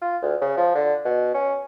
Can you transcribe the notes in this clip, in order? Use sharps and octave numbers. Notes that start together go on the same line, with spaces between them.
F4
D2
C#3
F3
D3
B2
C#4